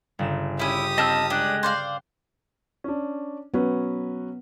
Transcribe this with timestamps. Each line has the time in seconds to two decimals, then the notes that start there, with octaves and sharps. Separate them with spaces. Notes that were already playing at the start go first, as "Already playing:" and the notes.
0.19 G1 C#3 E7
0.59 C#4 E4 G4 D#6
0.98 C4 D#5 A5 F6
1.30 G#3 D4 G5 F#6
1.63 C5 D5 F5
2.84 C#4 D4
3.54 F#3 B3 C#4 B4